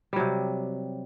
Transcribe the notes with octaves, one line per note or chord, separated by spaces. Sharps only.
C3 F#3 G3